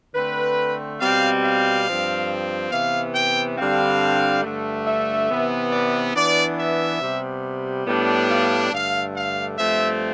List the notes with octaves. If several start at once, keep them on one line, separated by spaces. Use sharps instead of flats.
D3 A3 C4 B4
B2 G3 C4 F5
F5
G2 F3 C4
C3 E3 B3 F5
G5
G2 D3 G3 C4 F5
G2 D3 A3
E5
C3 E3 B3
D5
E3 B3 D4 D5
E5
C3 G3 B3
A2 G3 B3 D4
F5
G2 D3 A3 F5
F5
G2 F3 A3 C4 E5